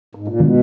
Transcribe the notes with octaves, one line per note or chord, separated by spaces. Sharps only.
G#2
A#2
B2 D#3 G#3 B3 D4